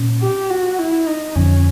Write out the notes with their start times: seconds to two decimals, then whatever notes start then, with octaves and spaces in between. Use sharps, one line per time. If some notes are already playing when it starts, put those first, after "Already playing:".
Already playing: A#2 C#4
0.22 G4
0.50 F#4
0.79 E4
1.07 D#4
1.36 F2 D3 F3 C#4